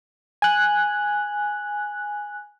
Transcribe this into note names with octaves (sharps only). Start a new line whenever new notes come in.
G#5 F#6